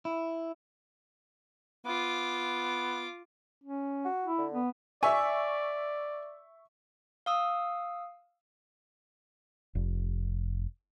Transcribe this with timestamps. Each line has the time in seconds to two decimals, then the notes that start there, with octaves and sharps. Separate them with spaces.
0.05 E4
1.86 B3 F4 D6
3.64 C#4
4.05 F#4
4.25 E4
4.38 D3
4.53 B3
5.03 D5 E5 G#5 C#6
7.26 F5 D#6 E6
9.75 F1